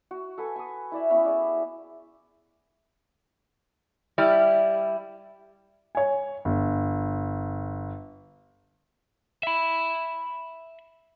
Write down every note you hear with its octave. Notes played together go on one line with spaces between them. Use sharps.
F#4
A4 B4 F#5 G#5
G#5 D#6
E4 D5 E5
B3 C#4 E4 E6
G#4 D5
G3 E4
C#5 G#5
G1
E5 B5